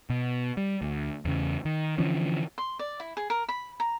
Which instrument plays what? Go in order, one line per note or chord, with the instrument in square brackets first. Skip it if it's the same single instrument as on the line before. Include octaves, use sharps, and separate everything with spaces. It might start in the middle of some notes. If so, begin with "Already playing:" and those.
[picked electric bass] B2
G3
D2
E2 C#3
D#3
D3 E3 F3 C#4
[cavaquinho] C6
D5
E4
G#4
A#4
B5
A#5